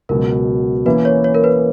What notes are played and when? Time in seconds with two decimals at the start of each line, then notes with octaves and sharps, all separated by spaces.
0.09 C#2 B2 F#3 A#4
0.85 E3 A#3 C#4 E4 B4
1.05 C#5
1.24 C#5
1.34 A#4
1.44 B4